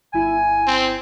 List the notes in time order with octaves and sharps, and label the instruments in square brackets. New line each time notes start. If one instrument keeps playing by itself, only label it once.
[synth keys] G1 E4 [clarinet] G#5
[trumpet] C4